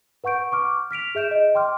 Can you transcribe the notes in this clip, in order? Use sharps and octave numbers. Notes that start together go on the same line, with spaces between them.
B4 F#5 C#6 G6 D7
C#6 D6 F6
F6 B6 D7 F7
G#4 E5 G6 D7 E7
D#5
G5 C6 D6 F6